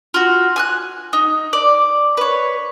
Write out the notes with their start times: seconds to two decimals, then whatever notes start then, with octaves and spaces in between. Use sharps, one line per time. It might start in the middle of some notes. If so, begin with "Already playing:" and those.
0.14 F4 F#4
0.56 G#5 F6 F#6
1.13 D#4
1.53 D5
2.17 B4 C#5